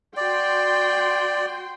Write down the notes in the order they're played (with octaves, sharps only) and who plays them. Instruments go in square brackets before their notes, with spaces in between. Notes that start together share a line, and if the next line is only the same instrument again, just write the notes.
[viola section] F#4 G5 C6 [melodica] D5